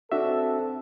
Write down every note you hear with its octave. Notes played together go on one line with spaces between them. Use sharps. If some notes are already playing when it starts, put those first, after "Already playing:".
C4 D4 F#4 A4 E5